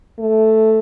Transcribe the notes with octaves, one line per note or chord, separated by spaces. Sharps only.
A3